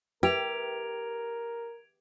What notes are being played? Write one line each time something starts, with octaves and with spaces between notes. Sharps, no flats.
G4 A#4 B4 E5 G5 G#6 D7 F7